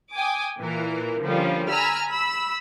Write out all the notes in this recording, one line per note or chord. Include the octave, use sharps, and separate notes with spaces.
G5 G#5 D6 D#6
A#2 E3 A#3 A#4
D3 F3 G3 A#3 C#4 F4
G#5 A#5 B5 E6 F6
B5 E6